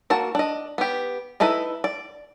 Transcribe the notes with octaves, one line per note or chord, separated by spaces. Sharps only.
A#3 F#4 A5
D4 D#5
B3 G4
D#4 E4 A4 B4 D#5
D5